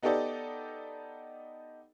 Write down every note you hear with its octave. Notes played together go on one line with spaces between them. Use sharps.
B3 D#4 G4 A4 D5 D#5